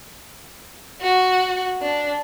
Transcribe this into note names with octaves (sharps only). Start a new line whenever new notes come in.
F#4
D4